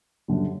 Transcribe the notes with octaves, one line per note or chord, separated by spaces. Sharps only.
F#2 D3 G3